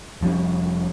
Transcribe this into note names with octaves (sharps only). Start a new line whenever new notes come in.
F1 F3 G3 C#4